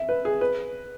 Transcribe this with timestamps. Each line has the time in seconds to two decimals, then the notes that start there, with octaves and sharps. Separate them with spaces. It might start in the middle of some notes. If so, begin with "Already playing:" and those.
Already playing: E5
0.09 B4
0.25 G#4
0.41 B4